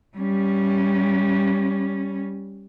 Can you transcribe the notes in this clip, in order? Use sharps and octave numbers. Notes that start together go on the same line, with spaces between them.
G3 C#4